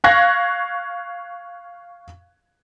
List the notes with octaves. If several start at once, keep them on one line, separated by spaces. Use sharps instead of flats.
F5 C#6 F#6 G#6 A#6